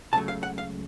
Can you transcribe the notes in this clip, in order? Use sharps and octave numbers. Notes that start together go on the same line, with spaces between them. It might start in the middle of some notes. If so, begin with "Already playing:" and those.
C#2 C#3 F#3 A3 A5
F5
F#5
F5